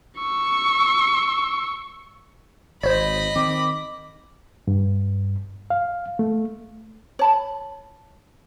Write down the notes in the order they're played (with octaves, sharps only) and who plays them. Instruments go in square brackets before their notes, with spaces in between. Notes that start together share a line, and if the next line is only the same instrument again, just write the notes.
[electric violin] C#6 E6
[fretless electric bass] G#1 [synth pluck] C5 C#5 [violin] D#5 B5
[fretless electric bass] D#3 C4 [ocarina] D6
[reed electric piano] G2
F5
A3
[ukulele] C#5 A5 B5